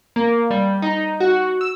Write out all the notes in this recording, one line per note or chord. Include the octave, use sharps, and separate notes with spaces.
A#3
G3
D#4
F#4
E6